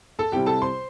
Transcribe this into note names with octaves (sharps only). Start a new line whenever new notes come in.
A4 A5
C3 G3 C4 E4 G4 G5
A4 A5
C5 C6